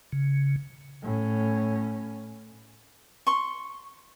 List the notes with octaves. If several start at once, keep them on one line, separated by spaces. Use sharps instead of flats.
C#3
A2 C#4
C6 C#6